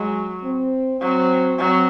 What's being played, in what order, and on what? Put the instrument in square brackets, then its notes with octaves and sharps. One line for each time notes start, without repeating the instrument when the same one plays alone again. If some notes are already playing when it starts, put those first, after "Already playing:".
Already playing: [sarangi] F#3 [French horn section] G#3
[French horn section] C4
[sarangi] F#3 [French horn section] C4
[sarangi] F#3 [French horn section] C4